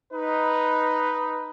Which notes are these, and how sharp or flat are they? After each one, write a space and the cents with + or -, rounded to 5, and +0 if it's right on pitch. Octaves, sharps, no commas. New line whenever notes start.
D#4 +0 B4 +0